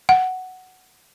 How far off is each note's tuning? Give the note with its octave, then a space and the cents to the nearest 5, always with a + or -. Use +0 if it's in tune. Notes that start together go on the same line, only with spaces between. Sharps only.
F#5 +5